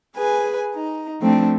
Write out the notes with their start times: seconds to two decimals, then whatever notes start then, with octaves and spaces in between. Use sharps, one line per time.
0.16 G#4 B4 G#5
0.73 D#4
1.21 F3 A3 C4 D4